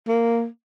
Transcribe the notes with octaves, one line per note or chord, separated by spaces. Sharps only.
A#3